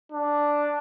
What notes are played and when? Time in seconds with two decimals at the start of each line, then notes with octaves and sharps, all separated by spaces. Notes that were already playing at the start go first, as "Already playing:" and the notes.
0.12 D4